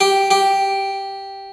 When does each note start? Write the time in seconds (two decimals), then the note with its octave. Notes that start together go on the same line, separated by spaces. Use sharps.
0.01 G4
0.31 G4